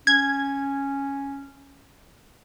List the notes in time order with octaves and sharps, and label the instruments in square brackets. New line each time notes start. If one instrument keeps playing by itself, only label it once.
[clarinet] C#4 [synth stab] G#6